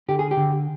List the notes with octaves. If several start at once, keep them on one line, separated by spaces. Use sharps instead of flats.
D3 G4
G#4
G4
D3